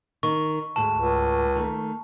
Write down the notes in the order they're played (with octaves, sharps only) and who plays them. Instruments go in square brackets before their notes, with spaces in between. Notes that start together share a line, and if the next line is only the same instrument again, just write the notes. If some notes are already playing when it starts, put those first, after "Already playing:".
[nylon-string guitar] D#3 [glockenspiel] C#6
[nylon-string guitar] D2 G#2 [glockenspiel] A5
[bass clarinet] C#2
[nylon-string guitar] D#3 A3